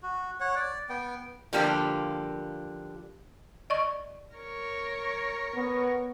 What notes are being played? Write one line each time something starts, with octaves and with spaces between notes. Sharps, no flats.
F#4
C#5 F#5
D5
B3 G5
D3 F3 G3 A#3 D4 G4
D5 D#5 C#6
A#4 C#5
B3